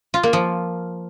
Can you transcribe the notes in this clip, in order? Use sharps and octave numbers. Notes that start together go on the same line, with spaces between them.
F4
A#3
F3